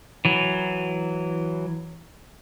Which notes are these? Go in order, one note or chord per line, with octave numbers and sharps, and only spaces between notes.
E3 F#3